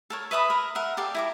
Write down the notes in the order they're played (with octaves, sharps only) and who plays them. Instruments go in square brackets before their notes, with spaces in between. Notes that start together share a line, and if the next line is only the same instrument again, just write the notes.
[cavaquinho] A4 A#4 C#5
B4 E5 B5 D#6
A#4
A#4 E5 F#5
G4 A4 D5 F5
E4 A#5 D6